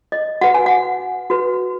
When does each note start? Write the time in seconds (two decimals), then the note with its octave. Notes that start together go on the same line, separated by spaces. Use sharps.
0.12 D#5
0.41 F#4 B4 F#5
0.54 G#5
0.66 F#5
1.30 F#4 B4